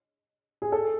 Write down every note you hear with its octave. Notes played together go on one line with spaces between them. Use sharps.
G#4
A4